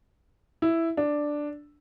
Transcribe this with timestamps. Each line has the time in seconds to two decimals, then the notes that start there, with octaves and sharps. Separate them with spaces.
0.62 E4
0.97 D4